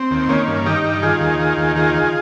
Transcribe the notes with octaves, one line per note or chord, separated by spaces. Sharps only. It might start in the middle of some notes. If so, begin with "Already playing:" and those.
Already playing: C4
D#2
D#3 A#3 C#4
G2
D#3 D#4 G4
G2
D#3 F4 G#4
D#2
D#3
D#2
D#3 F4 G#4
D#3